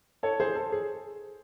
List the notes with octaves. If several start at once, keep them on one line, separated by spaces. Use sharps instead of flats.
A4 C#5
G#4 C5
A4
G#4